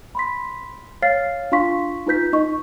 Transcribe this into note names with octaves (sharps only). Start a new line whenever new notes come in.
B5 C6 B6
C#5 F5 F6 A6 C7
D4 F4 F5 C6 C#6 B6
D#4 F4 B4 G6 B6
D#4 D#5 C#6